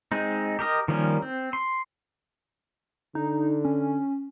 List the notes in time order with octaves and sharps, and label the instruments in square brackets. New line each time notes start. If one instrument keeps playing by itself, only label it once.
[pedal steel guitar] G#3 C4 D#4
G4 A#4 D#5
D#3 F3 G3 A#3 C#4
C4
C6
[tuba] D3 [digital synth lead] D#4
[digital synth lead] C#4